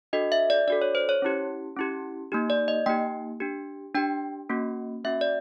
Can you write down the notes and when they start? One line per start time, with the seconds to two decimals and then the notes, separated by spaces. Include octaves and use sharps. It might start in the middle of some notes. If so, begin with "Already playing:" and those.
0.13 D4 F#4 A4 D#5
0.32 E5
0.50 D5
0.68 D4 F#4 A4 D5
0.82 C#5
0.95 C5
1.09 C#5
1.22 C#4 E4 G4
1.77 C#4 E4 G4
2.32 A#3 D#4 G4
2.50 D5
2.68 D#5
2.86 A#3 D#4 G4 G5
3.40 D4 G4
3.95 D4 G4 G5
4.49 A#3 C#4 F#4
5.04 A#3 C#4 F#4 E5
5.21 D5